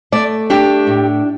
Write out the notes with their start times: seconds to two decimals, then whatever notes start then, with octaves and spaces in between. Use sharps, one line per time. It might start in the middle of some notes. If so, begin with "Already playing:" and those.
0.12 A3 D5
0.50 D4 G4
0.87 A2